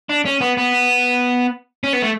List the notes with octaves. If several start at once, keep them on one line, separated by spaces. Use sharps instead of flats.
D4
C#4
B3
B3
C#4
B3
A3